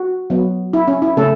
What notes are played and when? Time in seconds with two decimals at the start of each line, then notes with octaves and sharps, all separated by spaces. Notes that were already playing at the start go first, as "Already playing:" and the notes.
Already playing: F#4
0.30 F#3 B3
0.73 E4
0.88 C#4
1.02 E4
1.17 C#3 A3 C#4 A4